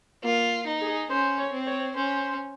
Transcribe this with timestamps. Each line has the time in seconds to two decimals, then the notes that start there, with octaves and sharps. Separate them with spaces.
0.24 A#3 F4
0.67 D#4
0.81 G#4
1.10 C#4 C5
1.38 C#5
1.53 C4
1.67 C#5
1.95 C#4 C5